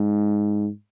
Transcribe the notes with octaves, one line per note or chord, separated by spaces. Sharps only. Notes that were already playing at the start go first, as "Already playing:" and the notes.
Already playing: G#2